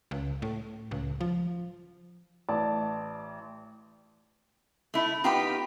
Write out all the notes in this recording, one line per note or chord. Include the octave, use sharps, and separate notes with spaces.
C#2
A2
C#2
F3
A1 D5 A5
A3 E4
B3 D#4 F4 G4 B5